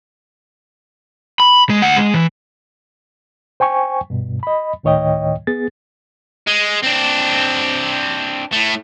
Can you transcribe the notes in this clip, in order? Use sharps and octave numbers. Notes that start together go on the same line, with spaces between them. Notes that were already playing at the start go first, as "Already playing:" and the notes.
B5
G#3
D2 F#5
G#3
E3
C5 G5 G#5 C#6
G2 B2
D#5 B5
D2 A2 D#3 C#5 D#5 G5
B3 G#4 A6
G#3
C4 D4
A2 A3